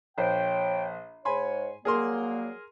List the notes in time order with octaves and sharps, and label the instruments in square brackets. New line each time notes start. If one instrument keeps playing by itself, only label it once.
[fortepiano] A#1 C5 [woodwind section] C#5 G5
[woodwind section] G#2 C#5 [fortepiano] G#5 B5 C6
[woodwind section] F#3 G3 A#3 [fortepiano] G#4 A#4 C6